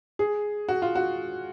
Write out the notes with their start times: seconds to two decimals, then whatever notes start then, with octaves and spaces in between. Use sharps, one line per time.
0.19 G#4
0.68 F#4
0.82 F4
0.95 F#4